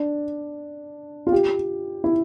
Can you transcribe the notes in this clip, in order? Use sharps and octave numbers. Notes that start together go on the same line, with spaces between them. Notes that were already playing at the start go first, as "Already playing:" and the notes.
Already playing: D4
F4
G4
E4